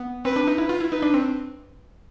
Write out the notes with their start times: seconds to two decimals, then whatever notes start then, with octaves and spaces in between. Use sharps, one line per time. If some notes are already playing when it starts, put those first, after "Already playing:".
Already playing: B3
0.25 C4 B4
0.36 D4
0.47 D#4
0.58 E4 B4
0.69 F4
0.80 E4
0.92 D#4 B4
1.02 D4
1.14 C4